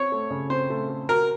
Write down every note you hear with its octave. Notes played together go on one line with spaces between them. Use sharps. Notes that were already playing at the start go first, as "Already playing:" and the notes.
Already playing: C4 C#5
A3
C#3
C4 C5
A3
A3
F#4 A#4